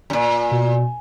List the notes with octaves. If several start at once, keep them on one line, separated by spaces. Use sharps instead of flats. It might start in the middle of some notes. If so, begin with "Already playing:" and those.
F#2 A#2
B2